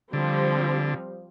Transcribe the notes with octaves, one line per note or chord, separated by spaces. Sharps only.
D3 F3 G3 C4